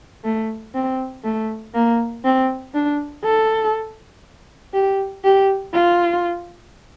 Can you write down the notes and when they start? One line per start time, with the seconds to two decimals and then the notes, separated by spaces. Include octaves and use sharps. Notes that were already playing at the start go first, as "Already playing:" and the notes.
0.24 A3
0.75 C4
1.24 A3
1.75 A#3
2.24 C4
2.74 D4
3.24 A4
4.74 G4
5.24 G4
5.74 F4